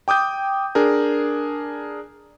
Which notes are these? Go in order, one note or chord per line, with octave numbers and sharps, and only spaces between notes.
G5 D6 D#6 G6
D4 G#4 A#4